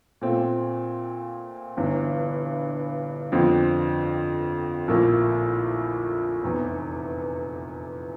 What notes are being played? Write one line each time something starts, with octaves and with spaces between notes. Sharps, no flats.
A#2 A3 C4 F4
G1 G2 E3
F2 D3 F3 C4
A#1 A2 F3 A#3
F1 E2 E3